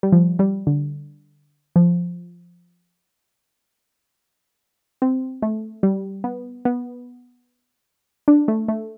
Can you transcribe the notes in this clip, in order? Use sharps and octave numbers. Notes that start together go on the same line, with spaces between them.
G3
F3
G3
D3
F3
C4
A3
G3
B3
B3
D4
A3
A3